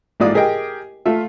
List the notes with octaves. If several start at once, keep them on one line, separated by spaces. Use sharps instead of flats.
A1 G#2 F4 D5 D#6
G4 G#4 A#4 D#5 G5
A3 F4 E5